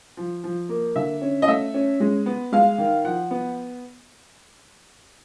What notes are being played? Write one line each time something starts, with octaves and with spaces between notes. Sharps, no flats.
F3
F3
A#3
D3 E5
C#4
D#5
A3 E5
C#4
G#3
B3
G#3 F5
D#3
F3 F#5
B3